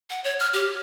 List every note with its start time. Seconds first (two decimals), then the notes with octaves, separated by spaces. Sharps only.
0.10 F#5
0.24 C#5
0.39 F6
0.53 G4